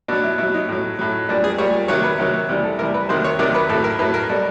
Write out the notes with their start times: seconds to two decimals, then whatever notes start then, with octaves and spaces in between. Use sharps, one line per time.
0.08 B2 F#3 D4
0.24 E4
0.38 B2 E4
0.43 F#3
0.54 D#4
0.69 A2 F#3
0.99 A2 F#3
1.29 A#2 G3 D4
1.44 G#4
1.58 A#2 G3 C#5
1.88 C3 D#3 F#3 C#5
2.04 B4
2.18 C3 D#3 F#3
2.49 C3 E3 G3
2.64 A4
2.78 C3 E3 G3 A#4
2.94 B4
3.09 C3 D#3 F#3 C5
3.24 C#5
3.39 C3 D#3 F#3 D5
3.55 B4
3.69 A2 A4
3.73 F#3
3.84 A#4
3.99 A2 F#3 B4
4.14 A#4
4.29 B2 G3 A4